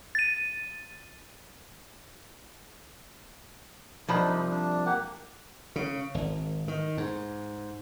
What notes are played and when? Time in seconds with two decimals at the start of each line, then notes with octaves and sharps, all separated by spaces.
0.15 A6 D#7
4.08 C2 F3 D4 D#4 B5
4.51 D4
4.86 A#3 G4 F#5
5.76 C#3
6.15 G#1
6.68 D#3
6.98 G#2